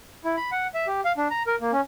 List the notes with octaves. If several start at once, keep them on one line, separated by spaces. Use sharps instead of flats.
E4
B5
F#5
E5
G4
F5
D4
A#5
A#4
A#3
C#4